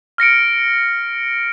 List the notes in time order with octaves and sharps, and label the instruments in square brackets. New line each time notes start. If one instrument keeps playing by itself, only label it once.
[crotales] F6 A#6 C#7 D7